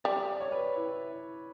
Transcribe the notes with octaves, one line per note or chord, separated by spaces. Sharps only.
G3 D5
D5
C#5
B4
E4